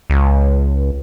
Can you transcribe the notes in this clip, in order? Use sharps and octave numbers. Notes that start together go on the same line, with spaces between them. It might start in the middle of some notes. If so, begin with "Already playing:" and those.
C#2